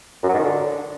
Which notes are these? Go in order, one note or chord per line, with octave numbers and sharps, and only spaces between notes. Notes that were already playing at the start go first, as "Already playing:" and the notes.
F#2
F#3
G#2
D#3
D3